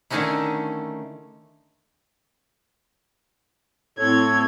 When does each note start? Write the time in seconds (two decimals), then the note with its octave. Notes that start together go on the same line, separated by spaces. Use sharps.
0.10 D3 D#3 A3 C#4 D#4 E4
3.99 A2 C4 A4 C#5 G#6